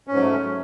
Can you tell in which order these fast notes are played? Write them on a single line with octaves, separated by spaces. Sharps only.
C#4 G#2 F#3 A3